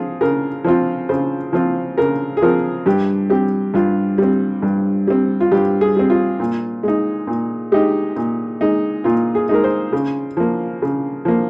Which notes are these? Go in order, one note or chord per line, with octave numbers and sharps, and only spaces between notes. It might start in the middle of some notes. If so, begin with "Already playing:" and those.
Already playing: F3 C4 F4 G#4
C#3 A#4
F3 C4 F4
C#3 C5
F3 C4 F4
C#3 A#4
G#4
F3 C4 F4 A#4
G2 G4
G3 C4 G4
G2 F4
G3 C4
G2
G3 C4
F4
G2 G4
G#4
G3 C4
F4
A#2
G#3 D#4
A#2
G#3 D#4 G4
A#2
G#3 D#4
A#2 F4
G#4
G#3 D#4 A#4
C5
C#3
F3 A#3
C#3
F3 A#3